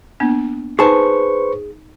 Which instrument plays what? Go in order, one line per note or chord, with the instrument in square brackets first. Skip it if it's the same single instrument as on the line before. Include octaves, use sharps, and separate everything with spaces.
[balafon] A#3 B3 D4
[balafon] D#4 [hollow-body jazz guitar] G#4 A5 [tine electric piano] B4 C5 C#6